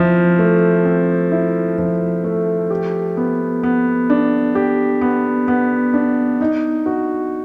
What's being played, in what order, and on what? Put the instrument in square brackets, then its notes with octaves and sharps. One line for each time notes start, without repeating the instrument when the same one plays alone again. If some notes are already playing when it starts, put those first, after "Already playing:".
Already playing: [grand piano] F3 C4 E4
A3
C4
E4
F3
A3
G4
B3
B3
D4
G4
B3
B3
D4
D#4
F#4